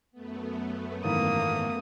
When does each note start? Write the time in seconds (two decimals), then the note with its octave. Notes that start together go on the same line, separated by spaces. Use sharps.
0.12 F#2 A3 B3
1.03 G#2 D#3 E3 A#3 D#6